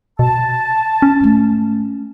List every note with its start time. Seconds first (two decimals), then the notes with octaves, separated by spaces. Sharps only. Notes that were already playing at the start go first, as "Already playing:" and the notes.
0.19 B2 A5
1.02 C#4
1.20 G#2 A3